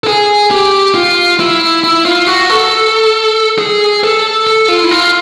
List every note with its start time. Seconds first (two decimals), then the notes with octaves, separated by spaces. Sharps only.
0.04 A4
0.07 G#4
0.51 G4
0.95 F4
1.40 E4
1.84 E4
2.06 F4
2.27 F#4
2.50 A4
3.58 G#4
4.04 A4
4.47 A4
4.68 F4
4.84 E4
4.91 F4